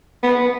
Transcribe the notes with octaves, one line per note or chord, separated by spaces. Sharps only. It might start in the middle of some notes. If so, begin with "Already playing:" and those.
B3